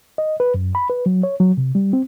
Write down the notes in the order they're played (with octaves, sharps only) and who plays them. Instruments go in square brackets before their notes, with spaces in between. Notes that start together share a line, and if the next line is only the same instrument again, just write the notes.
[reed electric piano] D#5
B4
F#2
B5
B4
F#3
C#5
F#3
C3
G3
C4